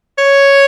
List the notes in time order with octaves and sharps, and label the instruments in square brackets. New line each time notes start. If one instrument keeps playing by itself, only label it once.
[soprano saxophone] C#5